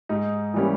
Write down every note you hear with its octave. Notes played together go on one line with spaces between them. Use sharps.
G#2 D#4
E3 G3 A#3 C#4